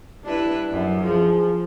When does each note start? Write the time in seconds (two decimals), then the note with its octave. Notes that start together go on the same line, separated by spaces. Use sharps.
0.24 G3 D4 E4 B4
0.72 F#2
1.03 F3 G#4